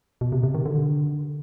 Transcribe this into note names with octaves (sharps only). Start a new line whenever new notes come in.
B2
C3
C3
D#3
D3